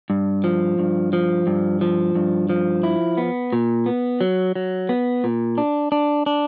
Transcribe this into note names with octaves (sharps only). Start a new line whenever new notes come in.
G2
F3
G2
F3
G2
F3
G2
F3
E4
B3
A#2
B3
F#3
F#3
B3
A#2
D4
D4
D4